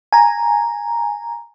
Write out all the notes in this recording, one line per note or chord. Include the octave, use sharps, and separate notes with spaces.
G#5 A#5